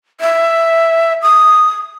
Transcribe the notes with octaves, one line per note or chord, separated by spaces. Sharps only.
E5
D#6